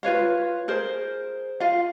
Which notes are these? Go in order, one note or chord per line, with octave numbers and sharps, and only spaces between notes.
F4 B4 C#5 F5
G#4 A#4 C5
F4 F5